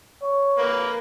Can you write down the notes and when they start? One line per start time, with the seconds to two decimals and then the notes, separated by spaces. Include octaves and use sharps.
0.22 C#5
0.58 A#3 B4